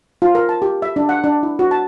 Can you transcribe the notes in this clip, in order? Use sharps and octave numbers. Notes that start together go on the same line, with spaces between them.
F4
A#4
A5
G4
E5
D4
F#5
D4
E4
F#4
A5